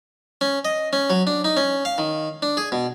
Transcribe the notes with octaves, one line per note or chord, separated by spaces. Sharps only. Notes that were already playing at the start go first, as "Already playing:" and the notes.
C#4
D#5
C#4
F#3
D4
D#4
C#4
F5
D#3
D4
G#4
B2